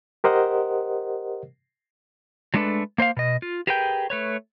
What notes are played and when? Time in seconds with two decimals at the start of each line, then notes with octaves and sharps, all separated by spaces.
0.24 G4 A#4 C5 D#5 F#5
2.54 F#3 G#3 A3 D4 A4 B4
2.98 A#3 C5 D#5 F5
3.17 B2 D#5
3.42 F4
3.67 G4 G#4 A#4 B4 C#5 G5
4.10 A3 B4 C#5